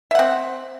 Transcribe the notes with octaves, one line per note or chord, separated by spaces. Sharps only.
C4 E5 F#5